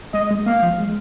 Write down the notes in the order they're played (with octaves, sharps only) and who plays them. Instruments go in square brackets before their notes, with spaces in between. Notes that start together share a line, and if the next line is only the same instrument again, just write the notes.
[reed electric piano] G#3 [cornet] D#5
[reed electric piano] G#3
[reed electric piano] A#3 [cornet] F5
[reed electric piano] F3
G#3